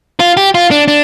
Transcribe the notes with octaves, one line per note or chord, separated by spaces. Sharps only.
F4
G4
F4
D4
D4